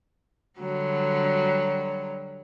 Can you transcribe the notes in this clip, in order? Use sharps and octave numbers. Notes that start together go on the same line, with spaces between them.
D3 F#3 G3